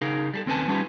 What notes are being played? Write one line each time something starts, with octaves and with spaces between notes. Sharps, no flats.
C#3 D#4 G#4 A#4 F5
G3 G#4 A4
D#2 C4 C#4 B4 G#5 A5
G3 C#4 D#4 F4 G4 B4